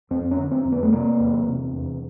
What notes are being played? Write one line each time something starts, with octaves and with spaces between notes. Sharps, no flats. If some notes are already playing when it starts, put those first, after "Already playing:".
F2 C4
C#4
D3
C4
F2
B3
A3
C3 A#3
E2
C3
E2